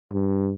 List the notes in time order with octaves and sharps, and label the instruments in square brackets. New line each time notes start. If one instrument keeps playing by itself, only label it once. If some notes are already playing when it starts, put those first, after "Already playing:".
[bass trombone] G2